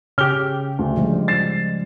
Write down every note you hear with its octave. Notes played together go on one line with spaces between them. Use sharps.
C#3 C#4 G4 F6 G7
D2
F3 G3 G#3
A6 C7 E7